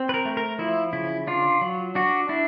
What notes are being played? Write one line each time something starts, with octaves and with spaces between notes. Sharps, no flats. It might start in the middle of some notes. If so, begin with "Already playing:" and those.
Already playing: C4
B4
A#4
A3
A#4
F3 E4
C#3 E4
D4 F4
F#3
D4 F#4
D4 E4